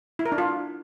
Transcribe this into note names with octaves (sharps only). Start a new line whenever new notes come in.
E4
A#4
D4
F4